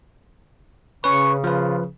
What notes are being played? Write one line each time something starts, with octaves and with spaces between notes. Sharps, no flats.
C#3 C#4 B4 C#6
F3 F4 B4